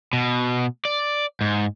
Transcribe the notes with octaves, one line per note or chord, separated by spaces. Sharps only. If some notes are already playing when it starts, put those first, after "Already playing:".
B2
D5
G#2